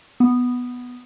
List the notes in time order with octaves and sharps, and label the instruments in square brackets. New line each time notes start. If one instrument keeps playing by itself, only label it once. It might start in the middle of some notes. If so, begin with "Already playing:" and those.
[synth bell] B3